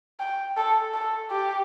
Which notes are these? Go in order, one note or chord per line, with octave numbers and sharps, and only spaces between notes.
G5
A4
A4
G4